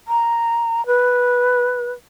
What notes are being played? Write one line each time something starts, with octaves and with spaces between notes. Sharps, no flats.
A#5
B4